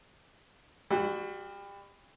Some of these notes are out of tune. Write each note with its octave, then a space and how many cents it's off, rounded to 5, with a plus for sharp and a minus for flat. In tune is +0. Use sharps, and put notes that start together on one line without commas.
G3 +30 F#4 +0